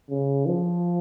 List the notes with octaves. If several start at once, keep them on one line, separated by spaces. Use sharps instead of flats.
C#3
F3